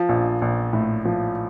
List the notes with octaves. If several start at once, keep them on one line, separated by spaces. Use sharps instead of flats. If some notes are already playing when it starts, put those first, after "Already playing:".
Already playing: F3
A#1
A#1
A2
F3